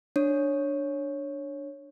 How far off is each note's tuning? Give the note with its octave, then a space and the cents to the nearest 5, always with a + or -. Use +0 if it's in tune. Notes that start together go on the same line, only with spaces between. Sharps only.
D4 +0 C#5 -5